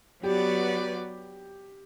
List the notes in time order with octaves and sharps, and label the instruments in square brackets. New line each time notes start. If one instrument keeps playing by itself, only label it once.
[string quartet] F#3 B3 F#4 B4 D5 [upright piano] G4